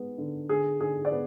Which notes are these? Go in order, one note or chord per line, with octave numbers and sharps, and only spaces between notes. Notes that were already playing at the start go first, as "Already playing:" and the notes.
Already playing: G#3 B3
D3
D3 G#4
D3 G#4
D5
B3 B4